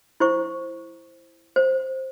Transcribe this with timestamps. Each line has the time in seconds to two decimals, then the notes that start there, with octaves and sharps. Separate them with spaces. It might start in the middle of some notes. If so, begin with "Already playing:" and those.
0.20 E4 C5 C#6
1.56 C5